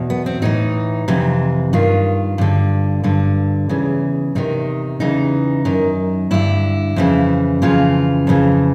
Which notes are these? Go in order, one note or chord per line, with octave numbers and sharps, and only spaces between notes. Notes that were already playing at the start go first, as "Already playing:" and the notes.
Already playing: E2 B2
B3
C4
A2 E3 D#4
F2 C3 E3
G2 D#3 F4
G2 D3
G2 D3
E2 C#3 E3
E2 C3 D#3 D#4
E2 C#3 E3 D#4
F#2 D#3
G2 D3 E4
F2 C#3 E3
F2 C#3 E3 F4
F2 C#3 E3